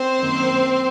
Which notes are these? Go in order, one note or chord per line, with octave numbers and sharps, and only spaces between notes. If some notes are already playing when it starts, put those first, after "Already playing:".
Already playing: C4 C5
F#2 D#3 F#3 A#3